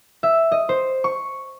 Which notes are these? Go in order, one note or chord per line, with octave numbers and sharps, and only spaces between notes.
E5
D#5
C5
C#6